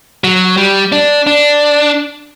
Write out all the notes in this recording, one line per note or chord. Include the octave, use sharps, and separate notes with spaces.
F#3
G3
D4
D4